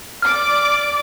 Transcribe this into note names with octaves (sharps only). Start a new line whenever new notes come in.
D5 D6 F6